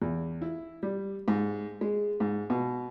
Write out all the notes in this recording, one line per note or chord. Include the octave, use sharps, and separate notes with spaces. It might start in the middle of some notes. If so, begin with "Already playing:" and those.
E2
E4
G3
G#2
G#3
G#2
B2